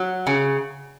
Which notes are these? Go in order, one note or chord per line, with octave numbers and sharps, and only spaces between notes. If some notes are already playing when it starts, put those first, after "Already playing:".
Already playing: F#3
C#3